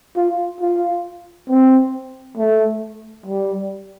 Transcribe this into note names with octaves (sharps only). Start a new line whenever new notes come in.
F4
F4
C4
A3
G3